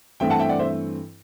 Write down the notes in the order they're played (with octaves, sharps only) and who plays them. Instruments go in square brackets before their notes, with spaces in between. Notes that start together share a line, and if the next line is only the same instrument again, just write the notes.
[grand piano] G2 E3 A3 C4 E5 G5
F#5 A5
E5 G5
D5 F#5
C5 E5